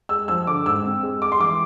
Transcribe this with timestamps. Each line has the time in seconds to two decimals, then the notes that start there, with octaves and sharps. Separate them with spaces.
0.09 G#3 E6
0.28 F3 E6
0.47 D3 D6
0.66 G#2 E6
0.85 C4
1.03 G#3
1.22 G#3 D6
1.32 C6
1.39 E3 D6